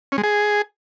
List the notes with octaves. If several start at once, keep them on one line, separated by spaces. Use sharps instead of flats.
C#4
G#3
G#4